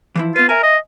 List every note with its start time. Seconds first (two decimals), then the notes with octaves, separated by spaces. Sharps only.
0.16 E3 F3 E4
0.36 B3 F4 B4
0.49 A#4 E5 G#5
0.63 D#5